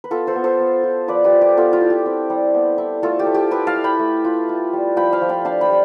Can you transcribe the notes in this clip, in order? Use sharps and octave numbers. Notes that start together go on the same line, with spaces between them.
B4
B3 F4 A4
A4 C5
B3
A4 C5
B3
F4
F3 B4 D5
G4 B4
F3
G4
B3 F4 A4
F4
E4
G4
C4
G3
B3
E4
A3 F4 A4
G4
A3
G4
E4 G4 B4
F5 A5
E4
G5 B5
A3
F4
F4
G3
F3 G5 B5
F5 A5
F3
G5 B5
D4 F5 A5
G5 B5
G3